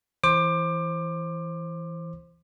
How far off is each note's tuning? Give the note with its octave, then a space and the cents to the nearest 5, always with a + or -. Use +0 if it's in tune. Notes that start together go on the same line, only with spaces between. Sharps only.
E3 +0 C5 +15 D6 +25